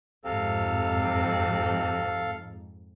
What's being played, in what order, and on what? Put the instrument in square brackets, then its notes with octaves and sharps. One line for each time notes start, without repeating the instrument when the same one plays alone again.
[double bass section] F2 G#2 [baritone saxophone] C3 [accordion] A4 F5